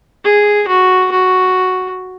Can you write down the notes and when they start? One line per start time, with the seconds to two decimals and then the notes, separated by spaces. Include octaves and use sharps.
0.25 G#4
0.68 F#4
1.11 F#4